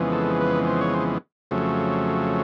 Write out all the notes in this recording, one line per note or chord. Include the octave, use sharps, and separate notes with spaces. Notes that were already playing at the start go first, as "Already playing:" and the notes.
Already playing: F2 C#3 E3 G#3 B3
A4
B4
C5
C#5
C5
F2 C#3 F#3 A3